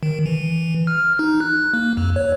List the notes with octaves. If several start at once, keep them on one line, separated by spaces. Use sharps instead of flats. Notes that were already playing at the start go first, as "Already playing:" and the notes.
D#3
E3
F6
D#4
F#6
A#3
F2
C#5